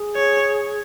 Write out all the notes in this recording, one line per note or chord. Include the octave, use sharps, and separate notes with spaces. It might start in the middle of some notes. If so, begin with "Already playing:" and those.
Already playing: G#4
C#5